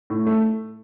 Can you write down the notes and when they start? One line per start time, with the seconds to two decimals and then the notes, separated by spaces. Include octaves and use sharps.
0.10 A2
0.27 A3